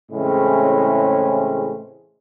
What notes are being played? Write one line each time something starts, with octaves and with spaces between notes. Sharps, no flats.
A2 C#3 E3 G#3 C4 C#4